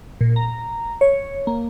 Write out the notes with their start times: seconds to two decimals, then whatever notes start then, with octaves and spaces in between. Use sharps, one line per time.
0.21 A#2
0.36 A#5
1.01 C#5
1.47 A#3